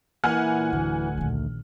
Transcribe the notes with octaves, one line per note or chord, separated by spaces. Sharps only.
A#2 E3 F#5 G#5 F6
D1 D2
A#1 D#3